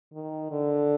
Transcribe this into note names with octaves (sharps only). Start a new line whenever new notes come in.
D#3
D3